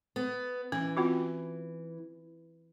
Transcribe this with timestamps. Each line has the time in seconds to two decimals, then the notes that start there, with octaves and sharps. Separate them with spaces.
0.16 B3
0.72 E3 C#4
0.97 C4 F4 F#4